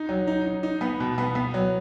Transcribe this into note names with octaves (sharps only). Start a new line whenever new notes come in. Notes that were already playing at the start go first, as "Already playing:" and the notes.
Already playing: D#4
F#3
D#4
D#4
D#4
B3
B2
B3
B3
F#3